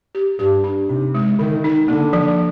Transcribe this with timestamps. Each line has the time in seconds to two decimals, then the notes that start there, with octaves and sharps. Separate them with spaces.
0.15 G4
0.39 G2 G4
0.64 D4
0.89 C3 D#4
1.15 G#3
1.39 D3 D#3
1.64 D#4
1.88 D3 A#3
2.13 F3